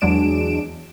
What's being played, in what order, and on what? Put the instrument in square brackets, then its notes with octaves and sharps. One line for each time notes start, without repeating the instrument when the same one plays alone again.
[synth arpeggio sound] E2 F#3 G#3 D4 D7 E7